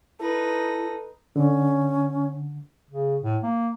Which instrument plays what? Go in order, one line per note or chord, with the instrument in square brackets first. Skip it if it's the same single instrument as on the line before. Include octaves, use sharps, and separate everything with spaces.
[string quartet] D#4 B4 A#6 [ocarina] E4 [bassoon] A4
[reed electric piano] D3 [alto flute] C#4
[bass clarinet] C#3
A2
A#3